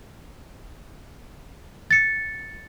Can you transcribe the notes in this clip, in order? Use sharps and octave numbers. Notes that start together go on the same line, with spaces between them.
A6 C#7